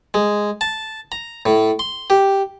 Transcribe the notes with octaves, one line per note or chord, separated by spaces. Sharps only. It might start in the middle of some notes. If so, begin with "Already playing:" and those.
G#3
A5
A#5
A2
C6
G4